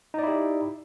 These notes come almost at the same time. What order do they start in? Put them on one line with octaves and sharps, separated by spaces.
D#4 D5 E4 G4